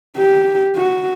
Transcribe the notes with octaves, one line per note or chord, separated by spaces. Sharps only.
G4
F#4